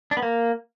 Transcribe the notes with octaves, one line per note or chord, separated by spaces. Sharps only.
D4
B3
A#3